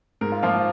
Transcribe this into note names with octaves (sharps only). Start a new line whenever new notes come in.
G#2 A#4
F4
F3 A#3 F4
F4